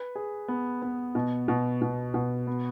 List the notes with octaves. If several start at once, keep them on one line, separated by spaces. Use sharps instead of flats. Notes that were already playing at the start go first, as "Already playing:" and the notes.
Already playing: B4
G#4
B3
B3
B2
B2
B2
B2
B3